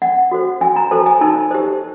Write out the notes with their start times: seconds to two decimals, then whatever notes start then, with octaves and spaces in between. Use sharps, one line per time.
0.02 C#4 F#5
0.31 F#4 A4 C5
0.61 C#4 G#5
0.76 A#5
0.91 F#4 A4 C5 A5
1.06 G#5
1.21 D#4 A5
1.51 G4 C5